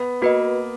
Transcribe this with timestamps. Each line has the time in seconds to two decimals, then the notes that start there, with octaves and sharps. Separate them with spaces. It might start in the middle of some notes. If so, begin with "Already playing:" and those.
Already playing: B3
0.22 A#3 F#4 B4 D#5